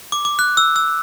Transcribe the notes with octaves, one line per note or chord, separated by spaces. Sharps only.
D6
D6
F#6
E6
E6